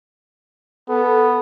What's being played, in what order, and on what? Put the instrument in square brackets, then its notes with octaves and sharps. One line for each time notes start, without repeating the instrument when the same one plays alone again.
[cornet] B3 [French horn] A4